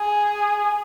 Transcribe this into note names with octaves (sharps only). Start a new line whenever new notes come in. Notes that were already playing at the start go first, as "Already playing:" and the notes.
Already playing: G#4